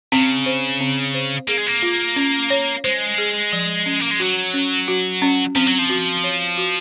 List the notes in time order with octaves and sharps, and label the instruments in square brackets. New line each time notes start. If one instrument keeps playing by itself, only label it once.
[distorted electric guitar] C#3 [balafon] C4
[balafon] C5
C4
C5
[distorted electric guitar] A#3 [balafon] G#4
[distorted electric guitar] G#3
A#3
[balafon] F4
C#4
C#5
[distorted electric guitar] G#3 [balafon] C5
[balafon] G#4
F3
C#4
[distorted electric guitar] A#3
G#3
[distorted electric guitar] F#3 [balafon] F#4
[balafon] C#4
F#4
C#4
[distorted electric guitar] F3 [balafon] C4
[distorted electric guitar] F#3
F3
[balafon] F#4
C#5
F#4